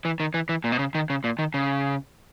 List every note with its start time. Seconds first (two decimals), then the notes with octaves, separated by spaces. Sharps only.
0.05 E3
0.20 D#3
0.34 E3
0.49 E3
0.64 A#2
0.72 B2
0.79 C#3
0.95 D#3
1.10 C#3
1.24 A#2
1.39 D#3
1.54 C#3